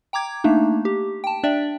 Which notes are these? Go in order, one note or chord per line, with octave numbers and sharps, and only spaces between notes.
G5 A#5 D6 G#6
A3 A#3 D4 D#4
G4
G5 A5
D4 D5 E5 G5